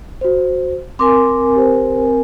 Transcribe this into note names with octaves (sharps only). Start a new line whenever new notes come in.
F#4 C5
C4 A#4 G#5 C6 D6
G4 C5